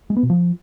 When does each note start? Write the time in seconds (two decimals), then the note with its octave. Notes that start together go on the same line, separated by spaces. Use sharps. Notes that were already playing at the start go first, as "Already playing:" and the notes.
0.10 G#3
0.17 B3
0.23 B2
0.30 F3